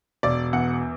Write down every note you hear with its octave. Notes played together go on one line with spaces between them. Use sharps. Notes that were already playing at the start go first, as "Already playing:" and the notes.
E1 D5
E2 F#5